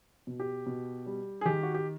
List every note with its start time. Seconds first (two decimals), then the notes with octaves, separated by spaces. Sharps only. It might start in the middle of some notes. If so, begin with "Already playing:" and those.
0.27 B2
0.40 G4
0.66 B2
1.06 G3
1.41 G#4
1.45 D#3 G4
1.63 F#4
1.74 G4